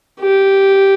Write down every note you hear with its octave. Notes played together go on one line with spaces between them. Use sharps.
G4